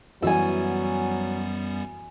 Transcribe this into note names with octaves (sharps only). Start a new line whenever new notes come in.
F#2 E3 F#3 G3 B3 F#4 G#5 E6